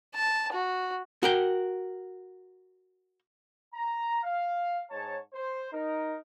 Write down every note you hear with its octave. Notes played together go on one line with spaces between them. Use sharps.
A5
F#4
F#4 A#4 G5
A#5
F5
G#2 C#5 A5
C5
D#4 A#4